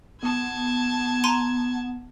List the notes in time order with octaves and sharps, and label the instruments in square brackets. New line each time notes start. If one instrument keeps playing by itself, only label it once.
[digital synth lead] B3 [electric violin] A5 G#6
[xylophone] A#5 C6 D#7